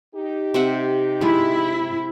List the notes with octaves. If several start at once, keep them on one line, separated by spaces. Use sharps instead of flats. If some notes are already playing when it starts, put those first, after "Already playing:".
D#4 G4
C3 E5 F#5
G#3 E4 F4